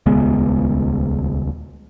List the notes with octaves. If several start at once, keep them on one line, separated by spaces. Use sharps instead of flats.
D#1 C#2 G#3 B3